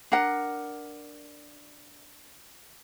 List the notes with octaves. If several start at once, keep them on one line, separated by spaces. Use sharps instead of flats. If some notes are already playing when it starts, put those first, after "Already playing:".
D4 A#4 F#5